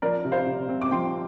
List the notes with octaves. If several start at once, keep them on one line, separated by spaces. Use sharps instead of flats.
F3 A#4 D5
C3
C5 F5
C3
C4
D6
F3 G5 C6